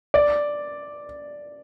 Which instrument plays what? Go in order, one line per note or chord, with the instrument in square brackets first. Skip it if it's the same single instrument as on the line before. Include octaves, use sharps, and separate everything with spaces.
[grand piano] D5